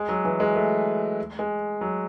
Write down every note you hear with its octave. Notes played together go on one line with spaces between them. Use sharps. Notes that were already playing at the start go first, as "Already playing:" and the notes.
Already playing: G#3
F#3
E3
G#3
A3
G#3
F#3